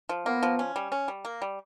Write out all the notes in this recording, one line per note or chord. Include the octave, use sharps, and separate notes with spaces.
F3
A#3 B3
F3
C#4
G3
C#4
G3
A#3
G3